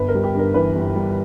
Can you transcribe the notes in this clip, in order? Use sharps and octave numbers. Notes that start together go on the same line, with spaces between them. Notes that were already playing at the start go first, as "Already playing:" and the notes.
Already playing: G1 B4
A#4
G3
G4
G2 A#4
E3 B4
G1
G3